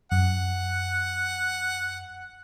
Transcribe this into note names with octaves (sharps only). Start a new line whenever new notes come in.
F#2 F#5